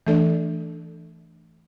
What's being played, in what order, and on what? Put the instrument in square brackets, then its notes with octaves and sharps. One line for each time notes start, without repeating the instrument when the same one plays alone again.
[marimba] E3 A3 D4 A4 D5